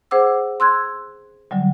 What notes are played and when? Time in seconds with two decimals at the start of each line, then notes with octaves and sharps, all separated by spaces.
0.11 G#4 C5 F#5 D6 E6
0.60 C6 E6 F#6 G#6
1.51 D3 F#3 G3